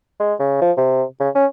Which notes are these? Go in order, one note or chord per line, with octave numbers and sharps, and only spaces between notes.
G#3
C#3
F3
C3
C#3
C#4